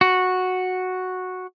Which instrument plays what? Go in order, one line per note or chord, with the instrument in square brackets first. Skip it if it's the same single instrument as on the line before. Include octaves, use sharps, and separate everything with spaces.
[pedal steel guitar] F#4